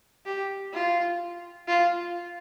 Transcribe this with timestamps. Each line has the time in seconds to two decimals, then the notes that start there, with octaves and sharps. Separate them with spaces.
0.26 G4
0.74 F4
1.68 F4